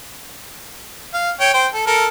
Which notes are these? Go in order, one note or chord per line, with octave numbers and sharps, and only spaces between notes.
F5
C#5 G5
C5 G5
A4
A4 A#4